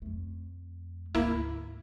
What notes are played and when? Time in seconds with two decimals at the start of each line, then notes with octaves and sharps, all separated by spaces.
0.02 F2 A3
1.15 D2 G#2 A#3 E4